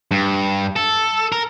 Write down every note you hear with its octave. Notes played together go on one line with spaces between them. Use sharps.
G2
A4
A#4